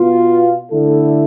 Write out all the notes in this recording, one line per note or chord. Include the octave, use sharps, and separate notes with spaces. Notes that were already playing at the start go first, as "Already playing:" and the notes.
Already playing: B2 B3 F4
D3 A3 E4 A4